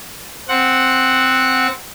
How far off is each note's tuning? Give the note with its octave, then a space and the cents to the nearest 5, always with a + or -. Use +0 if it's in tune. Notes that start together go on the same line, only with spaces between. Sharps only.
C4 +0 F#5 +0